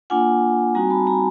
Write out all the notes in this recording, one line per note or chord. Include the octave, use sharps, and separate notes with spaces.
A#3 D4 F4 F#5 G#5
G3 C4 D#4 F#4 G#5 A#5
A5 B5
G#5 A#5